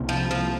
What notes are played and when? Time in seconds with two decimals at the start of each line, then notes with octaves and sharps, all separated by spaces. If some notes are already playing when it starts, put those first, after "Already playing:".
Already playing: C2 C3 A#3
0.09 F3
0.31 F3